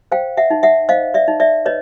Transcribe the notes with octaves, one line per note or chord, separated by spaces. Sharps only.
C5 F5 G5
E5 F#5
D#4
E5 F#5
C5 D#5 F5
D5 E5
D#4
D5 E5
B4 C#5 D#5